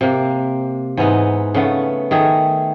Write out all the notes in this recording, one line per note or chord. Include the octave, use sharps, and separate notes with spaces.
C3 A#3
G#2 E3 B3 D#4
C#3 A3 B3
D#3 A3 G#4